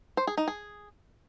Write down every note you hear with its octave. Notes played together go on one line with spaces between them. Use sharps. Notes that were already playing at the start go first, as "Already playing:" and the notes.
C5
G#4
D#4
G#4